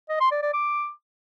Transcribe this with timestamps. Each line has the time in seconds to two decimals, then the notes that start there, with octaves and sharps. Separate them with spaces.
0.09 D#5
0.20 C6
0.32 D5
0.43 D5
0.54 D6